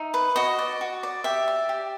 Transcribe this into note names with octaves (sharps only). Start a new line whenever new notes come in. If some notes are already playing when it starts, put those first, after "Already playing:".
Already playing: D#4 E5
B4
F#4 D#5
D5
F#4
D5
G4 E5
D5
G4